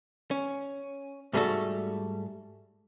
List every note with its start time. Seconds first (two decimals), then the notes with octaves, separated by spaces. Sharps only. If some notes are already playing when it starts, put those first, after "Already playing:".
0.31 C#4
1.33 G#2 G3 A3 F4 F#4 A4